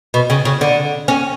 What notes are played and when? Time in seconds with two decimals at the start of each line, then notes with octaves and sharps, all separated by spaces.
0.14 B2
0.30 C#3
0.45 C#3
0.61 D3
1.08 C#4